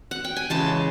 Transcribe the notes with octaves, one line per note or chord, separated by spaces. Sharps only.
F#5
G5
G#5
C#3 E3 G#3 A5